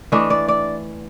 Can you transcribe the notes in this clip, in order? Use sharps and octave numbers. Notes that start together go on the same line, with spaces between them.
E3 A3 D4 D#5
D5
D5